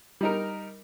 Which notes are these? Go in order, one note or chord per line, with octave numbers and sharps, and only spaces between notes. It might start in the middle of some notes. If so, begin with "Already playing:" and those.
G3 D#4 A#4